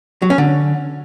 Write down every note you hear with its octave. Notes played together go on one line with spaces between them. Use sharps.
F#3
C#4
D3